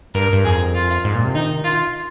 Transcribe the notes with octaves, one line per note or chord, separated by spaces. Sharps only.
G2 A#4
G2
F2 G#4
F4
G#2
A#2
C3
D#3 D#4
F4